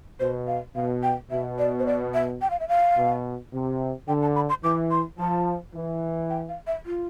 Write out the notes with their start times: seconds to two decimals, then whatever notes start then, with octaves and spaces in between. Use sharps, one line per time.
0.20 B2 C5
0.47 F5
0.75 B2 F5
1.03 G5
1.30 B2 E5
1.59 D5
1.79 C5
1.86 D5
2.14 E5
2.41 G5
2.50 F5
2.60 E5
2.68 F5
2.97 B2
3.53 C3
4.08 D3 G5
4.22 A5
4.35 B5
4.49 C6
4.63 E3 D6
4.91 C6
5.18 F3 A5
5.75 E3
6.30 G5
6.49 F5
6.67 E5
6.86 F4